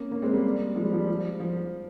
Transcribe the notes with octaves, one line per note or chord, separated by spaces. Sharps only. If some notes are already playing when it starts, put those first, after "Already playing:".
Already playing: A#3 C#4
A#3 C#4
G#3 C4
G3 A#3
F3 G#3
G3
F3
G3
F3
F3